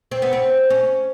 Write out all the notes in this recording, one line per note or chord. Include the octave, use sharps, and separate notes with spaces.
C4
B3
C4
C#4